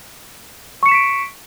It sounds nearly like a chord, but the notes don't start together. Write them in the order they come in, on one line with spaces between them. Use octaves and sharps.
C#6 C#7 E7 B6 D7